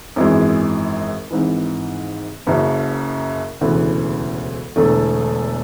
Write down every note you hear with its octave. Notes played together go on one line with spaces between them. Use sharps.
G#1 F#2 E3 G#3
G#1 G#2 E3
F#1 F#2 C#3
E1 D2 C#3 E3 B3
E1 E2 D3 A3